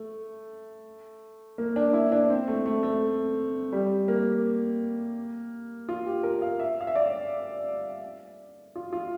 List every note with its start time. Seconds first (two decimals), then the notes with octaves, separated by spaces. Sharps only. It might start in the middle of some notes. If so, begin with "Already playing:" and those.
Already playing: A3
1.58 A#3
1.76 D4
1.93 E4
2.12 D4
2.30 C4
2.48 A3
2.66 A3
2.83 A3
3.73 G3
4.08 A#3
5.89 F4
6.06 G4
6.23 A#4
6.42 F5
6.60 E5
6.81 F5
6.87 E5
6.95 D5
8.75 F4
8.93 F4